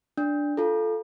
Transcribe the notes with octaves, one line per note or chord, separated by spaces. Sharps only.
D4
F4 A4